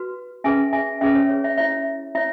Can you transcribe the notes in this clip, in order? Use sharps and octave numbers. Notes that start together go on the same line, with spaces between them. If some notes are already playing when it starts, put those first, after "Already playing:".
Already playing: F#4 B4
C#4 G#4 B4 E5 G#5
E5 G#5
C#4 G#4 B4 E5
C#5
C#5
E5
E4 C#5 E5
E4 C#5 E5